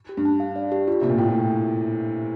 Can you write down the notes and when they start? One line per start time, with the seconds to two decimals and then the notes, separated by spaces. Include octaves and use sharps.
0.09 G4
0.17 G2
0.25 A5
0.40 F5
0.56 D5
0.72 G4
0.88 F4
1.01 C3 A#3
1.10 A#2
1.18 A2 G5